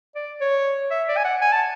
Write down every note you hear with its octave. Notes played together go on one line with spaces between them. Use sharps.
D5
C#5
E5
D5
G#5
F#5
G#5
A5